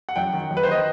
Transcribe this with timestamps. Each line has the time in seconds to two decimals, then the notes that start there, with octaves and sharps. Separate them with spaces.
0.09 F#5
0.16 F#2 G5
0.33 D#3
0.51 F#2
0.57 B4
0.63 C5
0.68 D#3 D#5